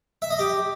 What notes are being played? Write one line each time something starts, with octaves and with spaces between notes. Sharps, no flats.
E5
D#5
G4